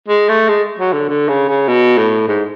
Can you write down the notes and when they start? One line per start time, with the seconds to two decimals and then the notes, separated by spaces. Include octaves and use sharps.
0.08 G#3
0.29 A3
0.49 G#3
0.79 F#3
0.93 D3
1.09 D3
1.28 C#3
1.49 C#3
1.68 B2
1.98 A2
2.28 G#2